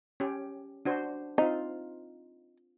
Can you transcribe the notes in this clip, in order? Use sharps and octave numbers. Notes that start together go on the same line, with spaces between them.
C#4 G4
D4 F#4 C5
C4 D#4 F4